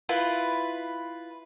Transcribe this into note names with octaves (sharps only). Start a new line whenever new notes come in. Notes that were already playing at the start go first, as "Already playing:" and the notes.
E4 F4 B4